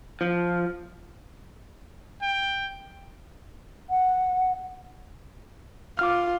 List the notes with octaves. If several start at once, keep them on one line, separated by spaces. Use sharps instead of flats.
F3
G5
F#5
F4 D6 F6